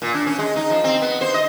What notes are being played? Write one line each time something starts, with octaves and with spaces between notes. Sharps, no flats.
A#2
D4
C#4
G#3
D#4
F3
C4
B3
C5
D#5